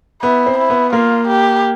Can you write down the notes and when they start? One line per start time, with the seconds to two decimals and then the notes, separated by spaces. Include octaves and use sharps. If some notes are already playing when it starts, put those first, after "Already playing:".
0.23 B3 E4
0.46 C4
0.58 E4
0.70 B3
0.93 A#3 F4
1.28 G4